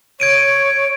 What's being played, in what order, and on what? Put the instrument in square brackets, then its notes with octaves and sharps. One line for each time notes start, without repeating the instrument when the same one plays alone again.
[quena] C#5 [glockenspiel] G#6 D7 D#7